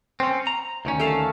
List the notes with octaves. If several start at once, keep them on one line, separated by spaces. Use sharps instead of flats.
C4 C#4
A#5
D2 D#3 C#4
A3 F5 A5